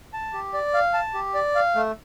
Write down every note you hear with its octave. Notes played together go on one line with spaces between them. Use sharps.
A5
G4
D5
F5
A5
G4
D5
F5
A3